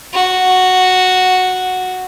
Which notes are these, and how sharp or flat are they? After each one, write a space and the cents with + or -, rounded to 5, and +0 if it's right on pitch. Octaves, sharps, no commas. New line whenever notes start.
F#4 -5